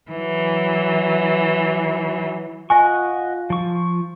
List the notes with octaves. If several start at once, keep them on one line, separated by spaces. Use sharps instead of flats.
E3 F#3
F4 D#5 F#5 G#5 C#6
F3 C#6